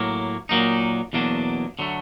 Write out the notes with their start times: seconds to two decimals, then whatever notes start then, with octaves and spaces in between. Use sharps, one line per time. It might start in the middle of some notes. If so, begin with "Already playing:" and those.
Already playing: A2 F#3 A#3
0.49 A#2 F#3 A#3 D#4
1.13 E2 B2 F#3 A#3 D4
1.79 D3 F#3 A3